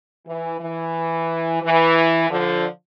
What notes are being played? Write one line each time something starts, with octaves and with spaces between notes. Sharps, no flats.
E3
E3
E3
D3 F3